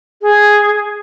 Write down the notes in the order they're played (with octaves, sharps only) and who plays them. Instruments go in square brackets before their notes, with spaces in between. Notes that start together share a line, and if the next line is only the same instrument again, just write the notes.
[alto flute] G#4